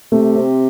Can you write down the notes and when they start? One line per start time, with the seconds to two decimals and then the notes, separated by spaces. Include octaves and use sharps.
0.12 C3 A3
0.35 C4